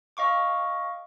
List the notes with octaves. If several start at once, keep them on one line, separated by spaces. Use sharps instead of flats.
D#5 F5 C#6 D6